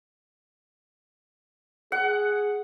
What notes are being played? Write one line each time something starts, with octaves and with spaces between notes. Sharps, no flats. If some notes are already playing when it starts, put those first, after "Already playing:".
G#4 F#5